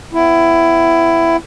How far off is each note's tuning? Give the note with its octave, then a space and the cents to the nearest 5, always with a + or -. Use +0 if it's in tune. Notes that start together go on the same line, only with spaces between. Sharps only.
B3 +35 E4 +15